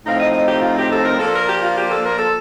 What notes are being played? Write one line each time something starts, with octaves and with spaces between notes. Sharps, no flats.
A2 F3 C4 D#4 F5
D#5
D#5
G4
F4
G4
A4
A#4
F3 A#3 D4 A4
A#4
G4
F4
G4
A4
A#4
A4